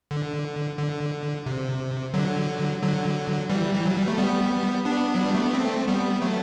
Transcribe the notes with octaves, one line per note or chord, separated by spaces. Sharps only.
D3
D3
C3
D3 F#3
D3 F#3
E3 G3
E3
F#3
G3
A3
G3 B3
B3 D4
F#3
G3
A3
B3
A3 C4
G3 B3
F#3 A3